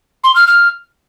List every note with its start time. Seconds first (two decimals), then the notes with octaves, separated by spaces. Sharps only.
0.24 C6
0.36 F6
0.47 F6